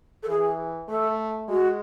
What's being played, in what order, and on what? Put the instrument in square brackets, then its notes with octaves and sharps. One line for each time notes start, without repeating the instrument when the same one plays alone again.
[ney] A4
[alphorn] E3 [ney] G#4
[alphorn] A3 [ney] A4
[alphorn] G#3 [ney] F#4